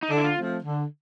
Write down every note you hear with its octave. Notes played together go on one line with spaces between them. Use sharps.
D#4
D3 D4
E4
F4
F3 A3 C4
D3